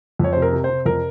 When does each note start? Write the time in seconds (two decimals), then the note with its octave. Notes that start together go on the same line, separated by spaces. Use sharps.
0.19 F2 C#5
0.33 C5
0.37 C3
0.42 A#4
0.53 C3
0.64 C5
0.70 C3
0.85 F2 A#4